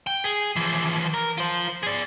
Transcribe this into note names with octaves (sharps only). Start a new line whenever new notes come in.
G5
G#4
E3 F3
A#4
F4 C5
G#4 D5